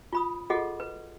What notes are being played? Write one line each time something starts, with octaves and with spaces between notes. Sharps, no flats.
F4 B5 D#6
F4 F#4 G#4 A4 D#5 F#5
B4